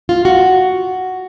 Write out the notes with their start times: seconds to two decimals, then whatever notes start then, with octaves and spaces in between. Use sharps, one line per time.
0.09 F4
0.25 F#4